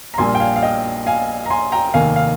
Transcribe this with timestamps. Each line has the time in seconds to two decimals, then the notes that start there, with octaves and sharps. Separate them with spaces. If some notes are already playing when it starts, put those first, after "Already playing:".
0.14 A#5
0.18 A#1 A#2 G3 A#3 G#5 C6
0.35 G5
0.40 F5 G#5
0.56 F5
0.63 D#5 G5
1.06 F5 G#5
1.46 A#5
1.50 G#5 C6
1.72 G5 A#5
1.94 F1 D#2 D#3 A#3 F5 G#5
2.16 F5